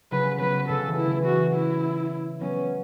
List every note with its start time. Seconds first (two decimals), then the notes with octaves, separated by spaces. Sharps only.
0.11 C#3 F#3 B4
0.40 F#3 B3 B4
0.69 C#3 F#3 A4
0.88 E3
0.97 E4
1.07 E3 A3
1.26 F#4
1.55 E4
2.41 F#3 B3 C#4